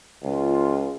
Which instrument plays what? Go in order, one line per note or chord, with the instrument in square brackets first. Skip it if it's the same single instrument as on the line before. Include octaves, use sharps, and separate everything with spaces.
[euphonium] C#2 [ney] F4